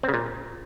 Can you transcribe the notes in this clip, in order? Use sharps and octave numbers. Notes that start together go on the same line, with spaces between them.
C4
C#3
A#2